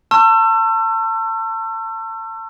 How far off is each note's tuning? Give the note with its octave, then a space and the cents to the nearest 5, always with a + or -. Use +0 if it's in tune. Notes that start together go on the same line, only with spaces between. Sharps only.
A5 +30 C#6 -35 E6 +35